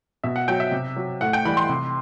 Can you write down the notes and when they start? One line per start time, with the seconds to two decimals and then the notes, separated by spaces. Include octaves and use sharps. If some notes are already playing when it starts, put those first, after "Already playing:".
0.24 B2 E5
0.36 F#5
0.48 F#3 G5
0.60 E5
0.72 C3
0.96 F#3
1.21 A2 F#5
1.33 G5
1.45 E3 G3 B5
1.57 C6
1.69 C3